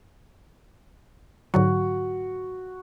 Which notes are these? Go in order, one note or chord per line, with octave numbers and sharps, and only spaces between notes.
G#2 D3 F#3 F#4